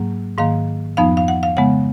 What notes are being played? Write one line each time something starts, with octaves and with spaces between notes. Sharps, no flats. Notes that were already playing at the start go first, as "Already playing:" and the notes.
Already playing: G#2 F#3 A#3
G#2 D#3 A#3 F5
F2 F3 B3 D#4 F5
F5
F#5
F5
C#3 G#3 B3 F#5